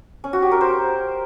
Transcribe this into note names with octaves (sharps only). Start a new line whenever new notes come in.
C#4
F#4
G4
A#4
C5